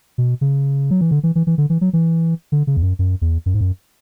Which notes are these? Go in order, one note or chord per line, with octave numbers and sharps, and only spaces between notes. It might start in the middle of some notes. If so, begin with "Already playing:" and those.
B2
C#3
F#3
E3
D3
E3
E3
E3
D3
E3
F#3
E3
D3
C#3
E2
F#2
F#2
E2
F#2
G#2
F#2